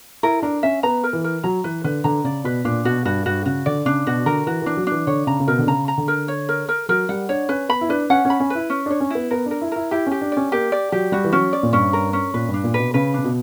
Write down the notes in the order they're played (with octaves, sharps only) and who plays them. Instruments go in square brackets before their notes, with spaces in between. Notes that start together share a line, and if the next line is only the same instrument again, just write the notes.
[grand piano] E4 [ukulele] A#4
[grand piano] D4 [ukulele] A#4
[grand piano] C#4 [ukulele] E5
[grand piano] B3 [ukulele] A#5
[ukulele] A#4
[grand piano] E3
[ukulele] A#4
[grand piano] F#3 [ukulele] A#5
[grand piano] E3 [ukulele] B4
[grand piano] D3 [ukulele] B4
[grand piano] D3 [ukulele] A#5
[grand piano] C#3 [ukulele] D5
[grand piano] B2 [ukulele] B4
[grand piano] A#2 [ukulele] D4
[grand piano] B2 [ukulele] F#4
[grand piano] G2 [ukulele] F#4
[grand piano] G2 [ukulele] F#4
[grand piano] C#3 [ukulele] F#4
[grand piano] D3 [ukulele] D5
[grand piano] C#3 [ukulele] D4
[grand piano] B2 [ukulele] F#4
[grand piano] D3 [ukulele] A#4
[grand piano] E3 [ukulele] F#4
[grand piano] E3 [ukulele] D4
[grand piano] F#3
[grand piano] E3 [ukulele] D4
[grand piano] D3 [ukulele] C#5
[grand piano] C#3 [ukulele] A#5
[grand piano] C#3
[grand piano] B2 [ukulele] A#4
[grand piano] D3
[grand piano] C#3 [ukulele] A#5
[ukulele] A#5
[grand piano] D3
[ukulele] A#4
C#5
A#4
A#4
[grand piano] F#3 [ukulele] A#4
[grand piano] G3 [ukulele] F#5
[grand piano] D4 [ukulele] C#5
[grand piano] C#4 [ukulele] B4
[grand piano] B3 [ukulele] B5
[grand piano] E4
[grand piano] D4 [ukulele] B4
[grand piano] C#4 [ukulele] F#5
[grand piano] C#4 [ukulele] B5
[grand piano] C#4
[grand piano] E4 [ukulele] B4
[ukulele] C#4
[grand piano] D4 [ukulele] C#5
[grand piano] C#4
[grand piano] B3 [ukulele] E4
[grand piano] B3 [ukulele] A#4
[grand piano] D4 [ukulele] A#4
[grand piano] E4
[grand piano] E4 [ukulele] A#4
[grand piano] E4 [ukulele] G4
[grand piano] C#4 [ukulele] G4
[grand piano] D4
[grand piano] C#4 [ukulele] D5
[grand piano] A#3 [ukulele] G4
[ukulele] D5
[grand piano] F#3 [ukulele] G4
[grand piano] G3 [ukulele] F#4
[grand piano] E3
[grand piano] F#3 [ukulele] C#4
[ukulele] D5
[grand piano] A#2
[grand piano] G2 [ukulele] C#4
[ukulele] A#4
C#4
[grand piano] A#2 [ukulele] B4
[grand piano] G2
[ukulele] D4
[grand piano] A#2
[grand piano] B2 [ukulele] B4
[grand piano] C#3 [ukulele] B4
[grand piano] C#3 [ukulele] D4
[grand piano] B2